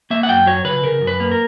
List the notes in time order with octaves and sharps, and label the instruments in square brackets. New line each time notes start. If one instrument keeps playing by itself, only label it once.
[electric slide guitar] A#3 E5
F#5
F#2 G5
F#3 C#5
C#3 B4
C#3 A#4
F#2
B4
A#3
A#4